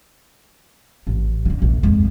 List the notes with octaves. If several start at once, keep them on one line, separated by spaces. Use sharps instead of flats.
A1
D3 D#3
A#1
F2 G#3